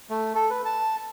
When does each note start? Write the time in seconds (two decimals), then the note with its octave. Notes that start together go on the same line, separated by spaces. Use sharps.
0.10 A3
0.35 A4
0.50 B4
0.65 A5